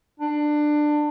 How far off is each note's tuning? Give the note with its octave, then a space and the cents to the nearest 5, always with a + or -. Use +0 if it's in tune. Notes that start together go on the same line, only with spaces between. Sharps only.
D4 +20